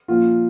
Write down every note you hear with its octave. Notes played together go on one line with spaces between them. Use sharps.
A#2 F3 F4